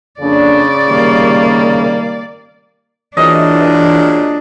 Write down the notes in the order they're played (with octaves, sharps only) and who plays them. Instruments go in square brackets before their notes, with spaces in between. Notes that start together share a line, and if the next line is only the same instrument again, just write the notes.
[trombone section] F2 A#3 D4 [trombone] C#3 [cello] D5
[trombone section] C3 D#3 G3 [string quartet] A#3
[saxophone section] A#2 F#3 G#3 [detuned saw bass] E3 [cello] D4 [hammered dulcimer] D#5